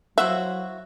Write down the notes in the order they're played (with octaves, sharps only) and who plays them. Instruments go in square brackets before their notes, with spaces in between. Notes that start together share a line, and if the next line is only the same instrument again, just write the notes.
[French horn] F#3 [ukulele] E4 C5 F5 [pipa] F#4 [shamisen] E5